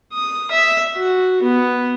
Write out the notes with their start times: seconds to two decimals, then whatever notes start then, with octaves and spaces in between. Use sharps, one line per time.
0.14 D#6
0.51 E5
0.95 F#4
1.42 B3